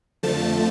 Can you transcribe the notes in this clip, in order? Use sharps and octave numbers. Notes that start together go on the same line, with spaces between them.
F2 D3 F3 A3 A5